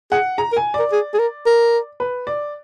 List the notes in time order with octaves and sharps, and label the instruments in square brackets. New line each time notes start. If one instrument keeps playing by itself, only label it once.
[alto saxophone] G#4 [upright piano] F#5
[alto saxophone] G#4 [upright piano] A#5
[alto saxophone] A#4
[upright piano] G#5
D5
[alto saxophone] A#4
G#4
G#4
A#4
A#4
[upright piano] B4
D5